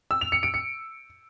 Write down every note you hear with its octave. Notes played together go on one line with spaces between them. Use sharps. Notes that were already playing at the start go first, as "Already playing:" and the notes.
E6
F7
C#7
D7
C#7